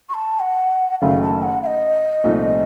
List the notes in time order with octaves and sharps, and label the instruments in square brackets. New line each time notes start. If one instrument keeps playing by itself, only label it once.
[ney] C#6
A5
F#5
[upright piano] F#1 F#2 D#3 A3 [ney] F5
[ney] A5
F#5
F5
D#5
[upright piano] C2 A#2 F3 A3 D#4